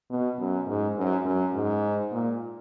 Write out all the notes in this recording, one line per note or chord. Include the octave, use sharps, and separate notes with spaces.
B2
F#2
G#2
F#2
F#2
G#2
A#2